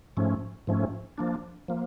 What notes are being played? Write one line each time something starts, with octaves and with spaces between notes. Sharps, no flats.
G#2 F3 A3 C#4
G#2 F3 A3 C#4
F3 A#3 D4
F3 A#3